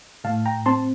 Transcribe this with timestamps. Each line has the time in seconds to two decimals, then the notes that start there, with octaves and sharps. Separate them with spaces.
0.24 A2 F5 A5
0.46 G5 A#5
0.66 C4 A5 C6